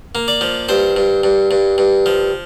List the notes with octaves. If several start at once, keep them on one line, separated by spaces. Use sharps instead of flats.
A#3
D5
F3
G2 C5
G2
G2
G2
G2
F3